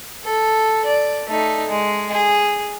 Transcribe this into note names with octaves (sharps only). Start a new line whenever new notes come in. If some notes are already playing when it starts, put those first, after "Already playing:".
A4
D5
A3 D#4
G#3
G#4